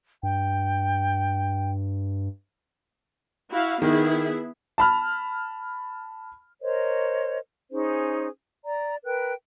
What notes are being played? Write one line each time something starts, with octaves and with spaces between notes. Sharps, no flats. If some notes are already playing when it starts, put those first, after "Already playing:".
G2 G5
E4 F#4 F5
D#3 B3 E4 G#4
A5 B5 F6
A#4 C5 C#5 D#5
C#4 D#4 G#4 C5
D5 A#5
A#4 B4 G5 F#6